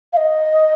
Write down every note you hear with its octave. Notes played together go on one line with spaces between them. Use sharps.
F5
D#5